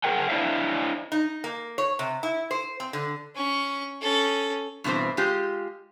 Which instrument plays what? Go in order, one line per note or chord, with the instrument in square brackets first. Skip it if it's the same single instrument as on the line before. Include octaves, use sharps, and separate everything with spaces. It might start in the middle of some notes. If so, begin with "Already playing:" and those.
[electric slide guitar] G#4 A#4 F#5 G5
D4 E4 C5 E5 F5
[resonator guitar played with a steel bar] D#4
A#3
C#5
C3
E4
C5
C4
D3
[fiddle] C#4 C#6
C#4 A4
[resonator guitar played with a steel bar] G2 B2 E3 C4 C5
G#3 F4 G4